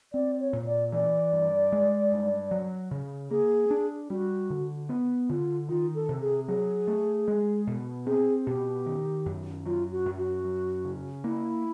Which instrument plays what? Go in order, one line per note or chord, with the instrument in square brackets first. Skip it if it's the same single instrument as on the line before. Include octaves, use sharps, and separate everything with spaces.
[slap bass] C4 [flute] D5
[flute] C#5
[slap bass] A#2
[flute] D5
[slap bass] E3 [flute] D5
[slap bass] G2
G#3
G2
F#3
C#3
[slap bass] A#3 [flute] G#4
[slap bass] D4
[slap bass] G3 [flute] F#4
[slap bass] D3
B3
[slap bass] D3 [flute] F4
[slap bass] D#3 [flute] F4
[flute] A4
[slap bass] C3
[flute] G#4
[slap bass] F#3 [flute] G#4
[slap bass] A3
G#3
B2
[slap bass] C4 [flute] G#4
[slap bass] B2 [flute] G4
[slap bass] D#3
F#2
[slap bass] F#3 [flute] F4
[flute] F#4
[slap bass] F#2
[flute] F#4
[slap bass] F#3
C#3
[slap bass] A#3 [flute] E4